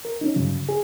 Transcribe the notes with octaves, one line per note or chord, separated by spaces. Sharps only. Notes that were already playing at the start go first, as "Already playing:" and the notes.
A#4
C#4 D#4
G2 C#3 F#3
G#4